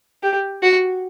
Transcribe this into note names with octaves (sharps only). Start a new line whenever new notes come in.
G4
F#4